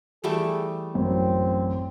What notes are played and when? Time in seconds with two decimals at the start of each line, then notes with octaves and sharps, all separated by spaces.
0.24 E3 G3 A3 G#4
0.95 A1 F#2 C4